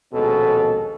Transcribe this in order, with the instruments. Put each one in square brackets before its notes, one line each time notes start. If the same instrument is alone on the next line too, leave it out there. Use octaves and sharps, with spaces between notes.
[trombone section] A#1 D#2 B2 G#3 C#4 A4